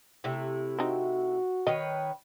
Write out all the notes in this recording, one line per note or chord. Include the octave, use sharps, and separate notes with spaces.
C3 A3 E4
C4 D#4 F#4
D#3 B4 C#5 D#5